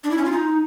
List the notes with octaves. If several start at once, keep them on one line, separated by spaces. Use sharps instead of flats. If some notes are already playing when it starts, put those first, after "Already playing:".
D4
E4
C#4
F4
D#4